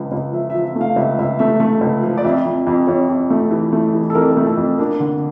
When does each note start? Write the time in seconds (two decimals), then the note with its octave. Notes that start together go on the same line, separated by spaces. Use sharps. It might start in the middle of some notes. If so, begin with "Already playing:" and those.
Already playing: C#2 F3
0.12 C#2
0.33 F3 E5
0.50 F3 E5
0.65 E5
0.75 A3
0.81 F5
0.96 C#2 E5
1.19 C#2 E5
1.39 A3 E5
1.60 A3
1.81 C#2
2.03 F3
2.17 D5
2.24 F2 E5
2.46 F2
2.67 F2
2.87 F2 C#5
3.09 F2
3.30 A3
3.51 E3
3.72 A3
3.93 E3
4.10 A4
4.15 F2 A#4
4.31 A#4
4.37 A3
4.47 A4
4.57 F2
4.78 A#3 D4
5.00 D3